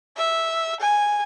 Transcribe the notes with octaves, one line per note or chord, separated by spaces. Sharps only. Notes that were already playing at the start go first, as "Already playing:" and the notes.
E5
G#5